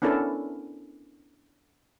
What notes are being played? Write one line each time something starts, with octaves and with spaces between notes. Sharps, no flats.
B3 C#4 D4 E4 A4 A#4